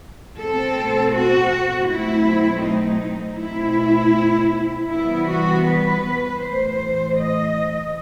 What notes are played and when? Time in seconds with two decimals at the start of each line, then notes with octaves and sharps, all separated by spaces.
0.38 B2 A3 C4 A4
1.14 F#4
1.89 B2 F#3 A3 C4 E4
2.64 D#4
3.40 B2 A3 C4 E4
4.91 C3 E3 G3 B3 E4
5.28 F#4
5.67 B4
6.41 A2 E3 A3 C5
7.17 D#5